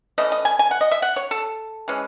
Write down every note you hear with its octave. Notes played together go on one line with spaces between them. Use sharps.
E3 A3 C#4 D#5
D#5
G#5
G#5
F#5
D#5
E5
F#5
C#5
A4
E3 G#3 C#4